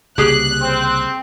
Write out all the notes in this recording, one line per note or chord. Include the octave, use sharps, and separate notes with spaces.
C2 C#3 A#3 G4 G#4 F#6
C4